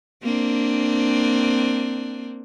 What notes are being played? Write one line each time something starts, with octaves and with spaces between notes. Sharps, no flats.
A#3 C4 D4